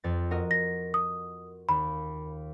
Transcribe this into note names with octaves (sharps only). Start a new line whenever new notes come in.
F2 A6
F#4 A#4 D#5
A#6
D#6
D#2 B5